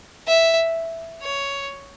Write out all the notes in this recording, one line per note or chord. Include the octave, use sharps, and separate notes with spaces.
E5
C#5